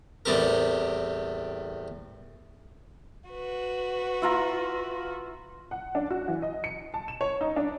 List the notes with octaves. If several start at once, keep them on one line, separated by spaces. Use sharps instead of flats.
E2 A2 G3 C4 G4 A#4
F#4 B4
E4 F4 A#5
F#5
D4
F#4
E3
D#5
C#7
A5
E7
C#5
D#4
D4